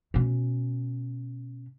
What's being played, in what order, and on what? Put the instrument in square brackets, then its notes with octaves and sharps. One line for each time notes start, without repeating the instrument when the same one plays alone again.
[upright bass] B2 C#4